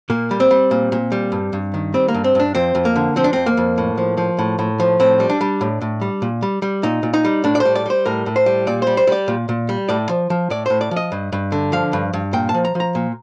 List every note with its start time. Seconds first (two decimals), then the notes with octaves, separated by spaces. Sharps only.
0.10 A#2 A#3
0.31 G3
0.40 C4
0.51 G3
0.71 A#2
0.92 A#2
1.12 G3
1.32 G2
1.53 G2
1.74 D#3
1.94 G3 C4
2.08 A#3
2.14 G2
2.24 C4
2.35 G2 D4
2.55 F2 C4
2.75 F2
2.85 A#3
2.96 D3
3.16 F3 C4
3.24 D4
3.33 F2 C4
3.46 A#3
3.57 F2
3.78 A2
3.98 F3
4.17 F3
4.39 A2
4.59 A2
4.80 F3
5.00 A2 C4
5.20 G3
5.30 D4
5.41 G3
5.61 A2
5.81 A2
6.01 G3
6.22 A#2
6.42 G3
6.62 G3
6.83 A#2 D#4
7.03 A#2
7.14 D#4
7.25 G3
7.44 A2 D4
7.55 D5
7.60 C5
7.65 G3
7.75 D5
7.86 G3 C5
8.06 A2 A#4
8.26 A2
8.36 C5
8.46 G3
8.67 A#2 D5
8.82 G3 C5
8.97 C5
9.07 G3 D5
9.28 A#2
9.49 A#2
9.69 G3
9.89 A2 D5
10.09 F3
10.30 F3
10.50 A2 D5
10.66 A2 C5
10.81 D5
10.91 F3
10.96 D#5
11.12 G2
11.32 G2
11.52 D3
11.72 F3 F5
11.93 G2
12.13 G2
12.33 A#2 G5
12.49 A5
12.54 F3
12.65 A#5
12.75 F3
12.80 A#5
12.95 A#2